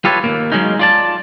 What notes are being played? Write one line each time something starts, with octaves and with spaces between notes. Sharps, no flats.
F4 G4 A4 B4 C#5
D#2 C3 A#3
F#3 G#3 A#3 C#4 D#4
F4 D5 A5